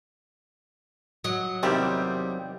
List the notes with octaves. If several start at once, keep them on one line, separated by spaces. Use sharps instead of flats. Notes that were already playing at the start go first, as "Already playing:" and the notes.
F#3 D#5
E2 C3 D#3 G3 A#3 C4 G4